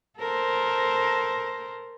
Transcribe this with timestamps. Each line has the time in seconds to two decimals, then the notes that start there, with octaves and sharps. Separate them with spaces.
0.19 A4 A#4 C5